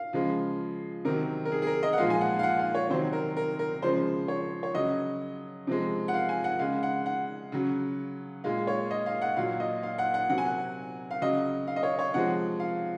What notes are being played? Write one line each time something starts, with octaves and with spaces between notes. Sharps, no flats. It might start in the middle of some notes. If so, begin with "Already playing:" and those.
Already playing: F5
C#3 F3 G#3
C3 D#3 F#3 A#4
A#4
G#4
G#4
A#4
D#5
F#5
A#2 F3 G#3 F5
G#5
F#5
F5
F#5
F5
C#5
C3 D#3 F#3 C5
A#4
A#4
A#4
C#3 F3 G#3 C5
C#5
C#5
C#3 F#3 D#5
C3 F3 G#3
F#5
F5
G#5
F#5
C#3 G#3 F5
F#5
F#5
C#3 F#3
A#2 G#3 F5
C#5
D#5
F5
F#5
A#2 F#3 F5
D#5
F5
F#5
F#5
C3 F#3 F#5
G#5
F#5
F5
C#3 F#3 D#5
F5
D#5
C#5
C#5
C3 F3 G#3 F#5
F5